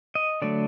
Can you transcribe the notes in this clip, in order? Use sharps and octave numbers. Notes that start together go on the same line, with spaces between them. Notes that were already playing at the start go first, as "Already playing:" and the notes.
D#5
D3 F#3 A3 D5